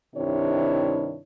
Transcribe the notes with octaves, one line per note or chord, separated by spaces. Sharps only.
G2 C3 D#3 D4 E4 C#5